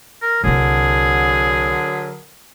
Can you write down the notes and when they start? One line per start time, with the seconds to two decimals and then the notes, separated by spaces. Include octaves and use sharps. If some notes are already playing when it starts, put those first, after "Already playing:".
0.22 A#4
0.44 C2 D3 F#3 D4 G#4 A#4